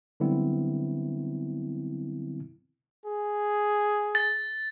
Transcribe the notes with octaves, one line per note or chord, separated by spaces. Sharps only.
D3 F#3 G3 B3 C4 E4
G#4
A6